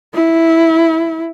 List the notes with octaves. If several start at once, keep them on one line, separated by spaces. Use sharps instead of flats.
E4